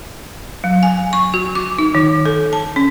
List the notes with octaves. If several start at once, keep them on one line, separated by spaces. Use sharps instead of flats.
F#3
G#5
C#6
F#4
D6
D#4
D#3
A4
A5
C#4